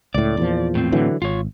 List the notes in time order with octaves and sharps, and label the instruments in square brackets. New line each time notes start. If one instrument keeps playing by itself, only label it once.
[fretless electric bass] C#2 A2 [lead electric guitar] D5
[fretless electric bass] E2 A#2 F3
[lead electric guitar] A2 C4
[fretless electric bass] D3 E3 F#3
[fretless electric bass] G#1 [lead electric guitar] F4 C#5